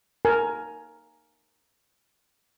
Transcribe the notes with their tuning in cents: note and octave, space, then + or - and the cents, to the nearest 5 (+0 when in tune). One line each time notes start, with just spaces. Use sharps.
A#4 +0 G#5 +20